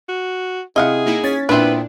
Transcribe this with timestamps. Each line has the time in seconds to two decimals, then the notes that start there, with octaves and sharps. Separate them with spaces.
0.08 F#4
0.76 C3 E4 G#4 D#5 F5 F#5
1.06 A#3 D#4 E4
1.24 C#4 G#6 A6 B6
1.49 A#2 B3 C4 D4 E4 B4